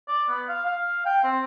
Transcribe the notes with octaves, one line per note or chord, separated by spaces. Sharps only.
D5
B3
F5
F5
G5
C4